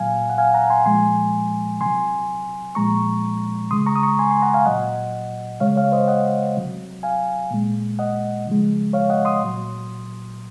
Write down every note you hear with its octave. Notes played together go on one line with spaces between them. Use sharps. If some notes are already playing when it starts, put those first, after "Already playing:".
Already playing: A#2 F#3 F5 G#5
F#5
F5 G#5
F#5 A#5
G#5 C6
A#2 F3 G#3 G#5 C6
C3 F#3 G#5 C6
A#2 F3 G#3 A#5 C#6
C#3 G#3 C6 D#6
A#5 C#6
D#6
A#5 C#6
G#5 C6
G#5 C6
F#5 A#5
F5 G#5
A#2 F#3 D#5 F#5
C#3 G#3 C#5 F5
C#5 F5
C5 D#5
D#5 F#5
C3 F#3
F5 G#5
A#2 G#3
D#5 F#5
C#3 F3 G#3
C#5 F5
D#5 F#5
C6 D#6
A#2 F#3